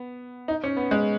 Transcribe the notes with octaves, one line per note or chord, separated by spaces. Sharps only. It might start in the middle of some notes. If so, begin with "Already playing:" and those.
Already playing: B3
D#4
C#4
B3
G#3